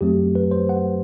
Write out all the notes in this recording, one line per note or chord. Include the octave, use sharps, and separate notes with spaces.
F#2 F#3 A3 C4 G4
B4
C5
F#5